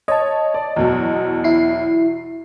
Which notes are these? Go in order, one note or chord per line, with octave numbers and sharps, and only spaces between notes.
C#5 D#5 A5
D5
E2 B2 F#3
E4 C7